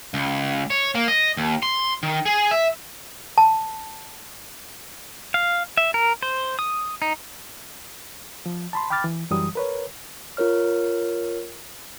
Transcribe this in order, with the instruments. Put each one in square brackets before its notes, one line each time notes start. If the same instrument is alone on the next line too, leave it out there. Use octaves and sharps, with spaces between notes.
[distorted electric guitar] C#2
C#5
A#3
D#5
D#2
C6
D#3
G#4
E5
[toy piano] A5
[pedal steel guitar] F5
E5
A#4
C5
D#6
D#4
[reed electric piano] F3
A5 B5 C6
G5 B5 D6 F6 A6
E3
F#2 E3 F#3 G3 D#6
A#4 B4 C#5
[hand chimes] F4 A#4 C#5 F6